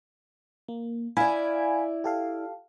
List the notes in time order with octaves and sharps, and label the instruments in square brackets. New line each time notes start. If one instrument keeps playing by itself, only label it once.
[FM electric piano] A#3
[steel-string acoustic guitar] E4 D5 [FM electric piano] F5 G#5 B5
[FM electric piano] G4 A4 F5